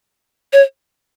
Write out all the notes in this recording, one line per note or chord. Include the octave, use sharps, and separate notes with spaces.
C#5